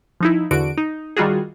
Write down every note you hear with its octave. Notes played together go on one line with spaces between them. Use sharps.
F3 D#4 E4
E2 D3 F#4 D7
D#4
D#3 G3 F4 F#4 G#4